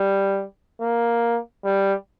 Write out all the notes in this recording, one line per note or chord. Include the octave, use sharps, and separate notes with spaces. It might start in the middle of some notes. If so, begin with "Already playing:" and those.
Already playing: G3
A#3
G3